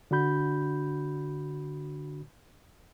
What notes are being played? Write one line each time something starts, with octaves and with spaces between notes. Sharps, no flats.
D3 D4 F#4 B5 G6